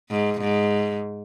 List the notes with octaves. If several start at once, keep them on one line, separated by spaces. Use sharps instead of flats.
G#2
G#2